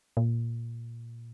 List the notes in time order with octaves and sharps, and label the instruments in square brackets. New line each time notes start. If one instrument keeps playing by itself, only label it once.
[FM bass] A#2